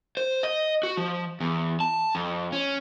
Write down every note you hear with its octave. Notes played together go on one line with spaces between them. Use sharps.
C5
D#5
F#4
F3
E2
A5
F2
C#4